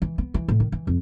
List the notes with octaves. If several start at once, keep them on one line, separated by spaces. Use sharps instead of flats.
E3
B3
E3
A2
D#3
E3
F2